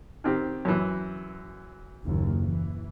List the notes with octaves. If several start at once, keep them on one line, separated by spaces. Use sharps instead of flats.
D#3 C4 G4
F#2 E3
F#1 D#2 A#2
E3